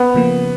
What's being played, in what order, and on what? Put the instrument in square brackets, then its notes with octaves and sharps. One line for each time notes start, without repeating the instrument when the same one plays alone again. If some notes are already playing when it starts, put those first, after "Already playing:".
Already playing: [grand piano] B3
[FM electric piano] C#3 F3 A#3